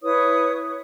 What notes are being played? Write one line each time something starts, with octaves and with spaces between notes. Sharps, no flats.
E4 B4 C#5 D#6